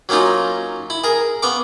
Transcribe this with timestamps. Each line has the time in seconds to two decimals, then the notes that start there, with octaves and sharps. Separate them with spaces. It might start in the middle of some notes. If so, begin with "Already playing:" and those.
0.09 F#3 A#3 C#4 D#4 F4
0.90 E4
1.04 G#4 A#4
1.42 B3 F5 C#6 D6